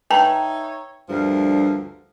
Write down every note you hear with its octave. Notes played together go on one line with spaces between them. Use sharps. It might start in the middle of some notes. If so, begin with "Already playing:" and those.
D#4 B4 C#5 E5 G5 A5 A#5
D2 G2 F3 A#4